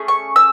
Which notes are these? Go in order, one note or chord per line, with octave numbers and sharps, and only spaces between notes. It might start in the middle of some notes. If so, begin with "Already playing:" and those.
Already playing: A3 C#4 G#4
C#6
E6